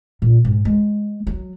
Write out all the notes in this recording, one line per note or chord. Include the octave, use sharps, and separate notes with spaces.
A#2
G#2
G#3
F#3